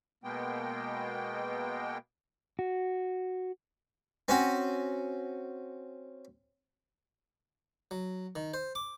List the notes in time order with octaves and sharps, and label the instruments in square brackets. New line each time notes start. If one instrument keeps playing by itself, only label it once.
[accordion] B2 G#3 A#3 B3 G5
[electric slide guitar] F#4
[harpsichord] C4 C#4 F#4
F#3
D#3
C5
D6